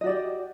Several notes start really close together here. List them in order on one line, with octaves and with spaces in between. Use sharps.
D#5 F#4 D5 G4